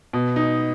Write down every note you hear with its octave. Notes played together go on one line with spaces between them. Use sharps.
B2
D#4